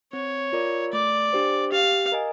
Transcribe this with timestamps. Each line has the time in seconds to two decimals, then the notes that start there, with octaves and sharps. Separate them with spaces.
0.13 C4 C#5
0.53 F4 A#4 D5
0.92 A3 D5
1.33 D4 G4 C5
1.72 G4 F5
2.12 A#4 D#5 G#5